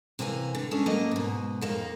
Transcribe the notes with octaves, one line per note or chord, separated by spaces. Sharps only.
C3 E3 A#3 F5 G#5
D3
G#3 C#4 D4 A4
D2 F#3 A#3 D#5
G#2 B2
F2 A#3 D#4